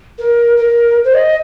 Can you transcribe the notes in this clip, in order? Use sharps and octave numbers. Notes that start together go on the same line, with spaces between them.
A#4
A#4
C5
D#5